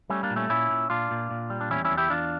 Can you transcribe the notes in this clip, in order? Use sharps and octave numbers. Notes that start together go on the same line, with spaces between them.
G3 A3 C#4
A#3 D4
A#2
A3 C#4
A#2 C#4 E4
A#2
A#2 D4 F4
A#2
A#2
G3
D4
E2 C#4 E4
C#4 E4
E2
E4 G4
E2 D4 F4